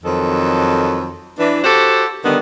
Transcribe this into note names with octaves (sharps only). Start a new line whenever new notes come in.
F2 D#3 F#3 A4
E3 D4
F#4 G4 A4 C5
D3 D#3 G3 B3